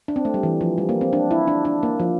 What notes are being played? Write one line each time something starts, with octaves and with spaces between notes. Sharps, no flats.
D4
C4
A3
G3
E3
F3
G3
A#3
C4
D4
E4
D4
D4
A#3
F3